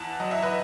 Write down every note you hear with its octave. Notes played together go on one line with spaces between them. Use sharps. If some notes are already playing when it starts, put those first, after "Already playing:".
Already playing: E2 F#5 A5
F#3 D#5
E5
B4 D#5